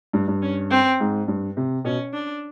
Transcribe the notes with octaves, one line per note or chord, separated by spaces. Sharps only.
G2
G2
C#4
C4
G#2
G2
C3
B2 C#4
D4